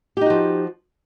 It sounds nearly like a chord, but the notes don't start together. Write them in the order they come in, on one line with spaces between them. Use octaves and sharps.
G4 D#4 F#4 F3